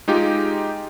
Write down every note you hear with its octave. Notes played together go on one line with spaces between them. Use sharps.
G#3 D#4 F4 G4